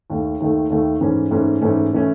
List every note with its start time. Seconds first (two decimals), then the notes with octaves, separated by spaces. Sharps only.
0.10 D#2 D#3 A3
0.40 D#2 D#3 A3
0.70 D#2 D#3 A3
1.01 G#2 E3 A3 C#4
1.31 G#2 E3 A3 C#4
1.61 G#2 E3 A3 C#4
1.93 E3 A3 C#4